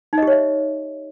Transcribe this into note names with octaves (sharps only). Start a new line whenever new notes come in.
D#4 G4 C#5 D#5 E5